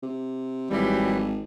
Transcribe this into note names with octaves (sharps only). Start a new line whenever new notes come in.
C3
G#1 E3 F#3 G3